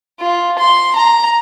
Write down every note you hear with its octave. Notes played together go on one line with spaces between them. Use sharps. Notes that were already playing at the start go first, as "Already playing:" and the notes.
F4
C6
A#5